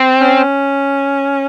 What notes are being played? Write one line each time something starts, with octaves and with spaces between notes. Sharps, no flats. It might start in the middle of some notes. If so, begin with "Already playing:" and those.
Already playing: C4
C#4